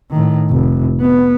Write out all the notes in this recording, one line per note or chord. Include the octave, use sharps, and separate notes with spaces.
A2 D#3
F1
B3